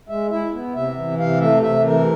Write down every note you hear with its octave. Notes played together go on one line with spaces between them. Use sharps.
G#3 E5
E4 E5
B3
C3 E5
E3
C3 F5
A3 E5
C3 E5
E3 A#4